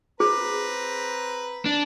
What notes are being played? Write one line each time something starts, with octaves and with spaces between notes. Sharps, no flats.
C4 G#4 B4 A#5
D4